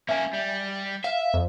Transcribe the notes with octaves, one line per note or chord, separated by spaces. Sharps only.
A#3 C#4 E5 G#5
G3
E5 F5
F2